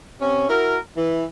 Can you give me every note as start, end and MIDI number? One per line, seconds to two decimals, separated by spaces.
0.21 0.49 48
0.21 0.49 61
0.49 0.78 64
0.49 0.78 66
0.49 0.78 70
0.96 1.24 52